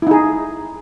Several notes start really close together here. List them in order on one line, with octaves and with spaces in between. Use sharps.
E4 D#4 G#4